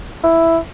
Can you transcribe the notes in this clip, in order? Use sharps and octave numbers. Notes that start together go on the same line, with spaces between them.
E4